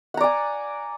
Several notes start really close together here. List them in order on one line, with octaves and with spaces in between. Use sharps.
F#5 A#5 D5 G#5